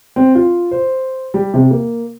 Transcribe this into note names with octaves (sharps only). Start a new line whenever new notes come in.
C4
F4
C5
G3
C3
A#3